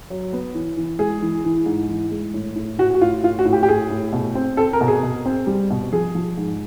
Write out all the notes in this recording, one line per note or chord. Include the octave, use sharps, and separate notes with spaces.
F#3
B3
E3
E3
G#3 G#4
E3
E3
G#2
E3
G#3
A2
A2
A2 F#4
F#4
A2 F4
A2 F4
F#4
A2
G4
G4
A2 G#4
A2
B2
C4
C4 A4
A#4
B2
G#4
B2
C4
G3
B2
F3 G#4
F3
G#2